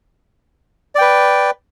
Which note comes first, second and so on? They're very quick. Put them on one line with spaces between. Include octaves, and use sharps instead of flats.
D5 G5 B4